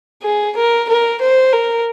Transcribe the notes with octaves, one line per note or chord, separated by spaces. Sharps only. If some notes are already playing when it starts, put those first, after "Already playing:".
G#4
A#4
A#4
C5
A#4